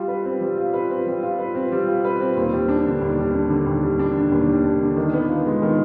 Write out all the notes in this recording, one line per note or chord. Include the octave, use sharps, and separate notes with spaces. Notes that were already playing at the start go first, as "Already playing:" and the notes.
Already playing: G3 F4
B4
C4
G3
F4
B4
C4
G3
F4
B4
C4
G3
F4
B4
C4
D#2
G3
D4
D3
D#2
G3
D4
D3
D#2
G3
D4
D3
D#2
G3
D4
D3
D#3
B3
F4
G#3
D#3